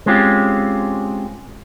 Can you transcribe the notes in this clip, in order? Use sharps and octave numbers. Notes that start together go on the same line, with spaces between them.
G#3 C4 C#4 F4 G4